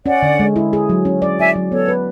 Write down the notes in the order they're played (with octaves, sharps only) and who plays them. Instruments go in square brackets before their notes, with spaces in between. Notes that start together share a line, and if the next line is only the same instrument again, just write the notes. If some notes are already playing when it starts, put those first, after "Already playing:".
[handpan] C#4 [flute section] D5 F#5
[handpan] D3
G#3
E4
G#4
F#3
C#4
D5
[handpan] E4 [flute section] E5 G#5
[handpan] F#3
[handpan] B3 [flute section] A4 C#5
[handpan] B4